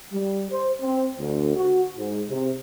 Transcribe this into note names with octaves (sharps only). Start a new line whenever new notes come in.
G3
C5
C4
D2
F#4
G#2
C3